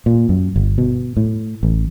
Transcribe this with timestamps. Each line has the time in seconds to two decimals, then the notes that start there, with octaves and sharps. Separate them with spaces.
0.06 A#2
0.29 F#2
0.56 G1
0.78 B2
1.17 A2
1.63 A1